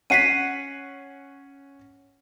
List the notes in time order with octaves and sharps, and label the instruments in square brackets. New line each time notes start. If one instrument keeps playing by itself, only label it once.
[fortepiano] C#4 F#5 [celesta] B6 C7 D#7